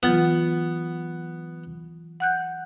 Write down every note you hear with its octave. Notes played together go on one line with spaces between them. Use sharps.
E3 F#3 B3 F4
F#5 F#6 G6